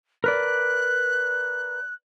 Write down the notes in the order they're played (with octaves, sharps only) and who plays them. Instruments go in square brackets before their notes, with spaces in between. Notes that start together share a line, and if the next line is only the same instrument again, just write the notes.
[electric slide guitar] A#4 B4 D5 [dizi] F#6